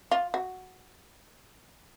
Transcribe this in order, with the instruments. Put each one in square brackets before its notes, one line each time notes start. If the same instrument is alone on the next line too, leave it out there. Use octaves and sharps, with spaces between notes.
[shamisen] F4
F#4